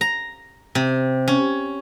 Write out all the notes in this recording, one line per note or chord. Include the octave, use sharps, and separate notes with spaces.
A#5
C3
C#4